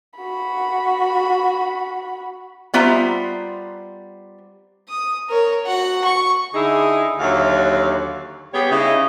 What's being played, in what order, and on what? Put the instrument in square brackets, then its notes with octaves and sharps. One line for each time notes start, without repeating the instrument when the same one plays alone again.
[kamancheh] F#4 B5
[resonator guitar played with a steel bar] G3 B3 F4 C5 E5 A#5
[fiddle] D#6
A#4 C#5
F#4 F#5
C#6
[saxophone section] D3 D#4 E4 G#4
D#2 D3 F#3 F#4 E5 F5
G3 B3 G4 G#4 C#5
C#3 D#4 E4